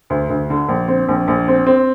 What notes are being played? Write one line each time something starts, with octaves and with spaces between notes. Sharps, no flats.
D2
D2
D3
A#1
C4
A#1
A#1
C4
C4